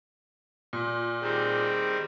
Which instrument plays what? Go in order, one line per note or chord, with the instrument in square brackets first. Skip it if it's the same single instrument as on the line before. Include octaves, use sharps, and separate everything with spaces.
[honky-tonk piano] A#2
[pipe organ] D#3 G3 C4 [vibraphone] G#4